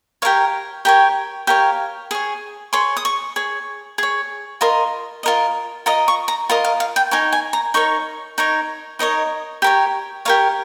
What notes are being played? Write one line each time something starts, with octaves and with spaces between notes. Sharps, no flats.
G4 A#4 C#5 F5
G4 A#4 C#5 G5
G4 A#4 C#5 F5
G#4 C#5
G#4 C#5 C6
D#6
C#6
G#4 C#5
G#4 C#5
F4 A#4 D#5 C6
F4 A#4 D#5
F4 A#4 D#5 A#5
C#6
A#5
F4 A#4 D#5 A#5
F5
F5
G5
D#4 A#4 C#5 G#5
G#5
A#5
D#4 A#4 C#5 C#6
D#4 A#4 C#5
D#4 A#4 C#5 D#5
G4 A#4 C#5
G4 A#4 C#5 F5